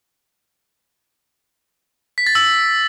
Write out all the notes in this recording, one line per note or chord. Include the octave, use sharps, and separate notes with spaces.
B6
A6
E6